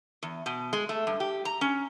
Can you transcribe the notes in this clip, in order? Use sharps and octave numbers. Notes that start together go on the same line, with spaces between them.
E2
B2
G#3
A3
G2
G4
A#5
C#4